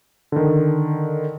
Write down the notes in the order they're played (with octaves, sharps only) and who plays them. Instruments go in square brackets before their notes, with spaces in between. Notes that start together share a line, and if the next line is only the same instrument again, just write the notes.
[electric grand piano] D3 D#3